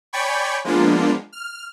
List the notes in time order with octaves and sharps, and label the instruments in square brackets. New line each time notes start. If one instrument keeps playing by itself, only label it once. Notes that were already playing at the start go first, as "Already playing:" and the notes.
[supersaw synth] C#5 D5 G5 G#5 B5 C#6
F3 G#3 A#3 B3 D4 F4
F6